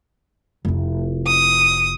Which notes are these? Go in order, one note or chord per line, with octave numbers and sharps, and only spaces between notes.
F1 E4
D#6